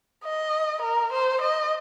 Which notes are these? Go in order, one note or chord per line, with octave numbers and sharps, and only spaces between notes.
D#5
A#4
C5
D#5